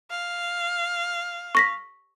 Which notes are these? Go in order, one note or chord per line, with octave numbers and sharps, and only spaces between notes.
F5
C#6 A#6 B6